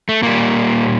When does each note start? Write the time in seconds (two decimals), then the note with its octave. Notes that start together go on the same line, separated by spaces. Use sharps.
0.09 A3
0.23 A#2 G3 A#3